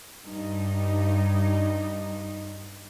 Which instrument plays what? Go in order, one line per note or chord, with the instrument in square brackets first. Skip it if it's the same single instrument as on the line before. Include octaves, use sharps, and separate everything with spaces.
[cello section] G2 D#4